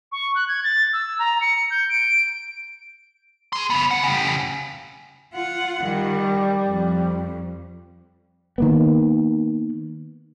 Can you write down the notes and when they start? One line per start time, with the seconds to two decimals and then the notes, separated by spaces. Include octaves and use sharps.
0.12 C#6
0.35 F#6
0.48 G#6
0.64 A6
0.93 E6
1.19 A#5
1.41 C#7
1.71 G6
1.89 D7
3.53 G#4 C6
3.70 C#3 B3
3.91 D#3 F#5
4.03 C#3 G4
5.34 F4 F#5
5.84 D#3 G3
6.70 F2
8.58 D#3 A#3 B3